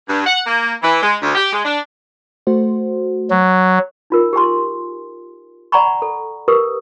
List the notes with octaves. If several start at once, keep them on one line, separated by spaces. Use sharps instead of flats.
G2
F#5
A#3
E3
G#3
D2
G4
G#3
D4
A3 F#4 C5
F#3
D#4 F4 A#4
G4 G#4 G#5 C6
D5 F#5 G#5 A#5 B5 C#6
A4
G4 A#4 B4 D#6